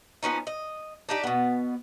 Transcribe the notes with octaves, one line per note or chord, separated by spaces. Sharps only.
F3 B3 C#4 D#4
D#5
D4 D#4 G4
B2 B3